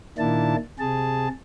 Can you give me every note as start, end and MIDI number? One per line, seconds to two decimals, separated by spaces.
0.18 0.56 46
0.18 0.56 51
0.18 0.56 58
0.18 0.56 62
0.18 0.56 64
0.18 0.56 81
0.79 1.28 48
0.79 1.28 68
0.79 1.28 81